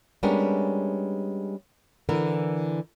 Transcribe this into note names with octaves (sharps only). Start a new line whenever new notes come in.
G3 G#3 B3 C#4 D4 A#4
D3 E3 A#4